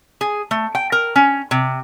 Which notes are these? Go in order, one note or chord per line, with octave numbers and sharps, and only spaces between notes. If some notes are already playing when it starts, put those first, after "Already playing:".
G#4
A3
G5
A#4
C#4
C3